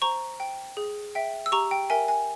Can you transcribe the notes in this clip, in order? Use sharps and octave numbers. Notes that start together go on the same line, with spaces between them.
C5 A#5 C#6
G5
G#4
E5 G5
E6
G4 A#5 C#6
G5
A#4 E5 G5 G#5
G#5